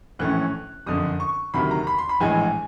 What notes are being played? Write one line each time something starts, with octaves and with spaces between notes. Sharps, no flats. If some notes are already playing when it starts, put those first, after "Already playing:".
A#1 A2 E3 A3 C#4 F#6
F#1 F2 D3 D#6
C#6
D2 C3 D#3 F#3 B5
A#5
B5
C6
B5
A#1 A2 E3 G#3 G#5